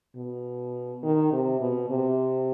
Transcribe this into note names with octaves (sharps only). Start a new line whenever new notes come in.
B2
D#3
C3
B2
C3